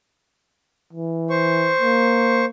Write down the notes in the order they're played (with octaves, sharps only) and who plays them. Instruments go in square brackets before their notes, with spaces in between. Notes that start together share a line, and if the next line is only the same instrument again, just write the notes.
[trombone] E3
[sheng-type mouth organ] C5 C#6
[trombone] A#3